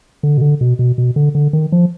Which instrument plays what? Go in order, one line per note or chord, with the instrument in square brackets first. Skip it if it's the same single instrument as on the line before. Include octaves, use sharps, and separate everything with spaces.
[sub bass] D3
B2
D3
B2
B2
B2
D3
D3
D#3
F3